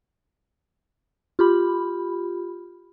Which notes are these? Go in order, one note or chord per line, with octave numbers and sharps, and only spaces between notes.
F4 G4 B5